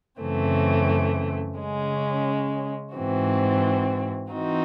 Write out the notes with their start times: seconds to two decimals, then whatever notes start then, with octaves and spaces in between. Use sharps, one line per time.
0.20 F#2 C#3 E3 A3 C4
1.57 C#3 G#3 C#4
2.95 G#2 E3 C4 F#4
4.33 E3 C4 D#4 F#4